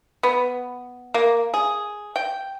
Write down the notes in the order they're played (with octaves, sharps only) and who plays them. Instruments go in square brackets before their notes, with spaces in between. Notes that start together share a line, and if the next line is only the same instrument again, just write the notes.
[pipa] B3
A#3
G#4
G5